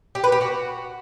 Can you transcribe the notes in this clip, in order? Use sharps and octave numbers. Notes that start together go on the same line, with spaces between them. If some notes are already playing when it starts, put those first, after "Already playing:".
G4
B4
G4
F#4